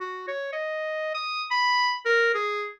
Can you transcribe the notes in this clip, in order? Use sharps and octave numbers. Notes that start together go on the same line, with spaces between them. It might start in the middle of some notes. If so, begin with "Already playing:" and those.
F#4
C#5
D#5
D#6
B5
A#4
G#4